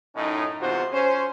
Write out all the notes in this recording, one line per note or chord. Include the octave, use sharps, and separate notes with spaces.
F#2 A2 C#4 D#4
E2 G#2 C3 F4 F#4 C5
C#4 C5